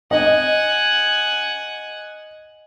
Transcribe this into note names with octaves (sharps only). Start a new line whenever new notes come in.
D#5 F#5 G#5